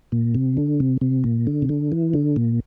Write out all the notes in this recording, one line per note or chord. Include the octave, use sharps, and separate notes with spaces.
A#2
C3
D3
C3
C3
A#2
D3
C3
D3
E3
D3
A#2